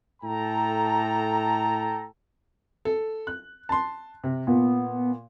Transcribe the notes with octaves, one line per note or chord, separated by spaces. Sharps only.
A2 A4 G5 A5 A#5
A4
F#6
A5 C6
C3
A#2 B3